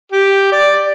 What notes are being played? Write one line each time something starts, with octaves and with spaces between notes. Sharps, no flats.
G4
D5